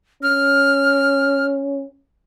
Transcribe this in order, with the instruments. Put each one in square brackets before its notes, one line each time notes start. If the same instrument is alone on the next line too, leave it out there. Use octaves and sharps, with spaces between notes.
[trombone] C#4 [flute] F6